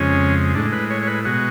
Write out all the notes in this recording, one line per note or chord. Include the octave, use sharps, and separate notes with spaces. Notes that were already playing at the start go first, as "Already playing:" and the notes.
Already playing: F2 C#3 G#3 C#4
A2 G#3 D4
B4
C#5
C#5
B4
B2 G#3 F#4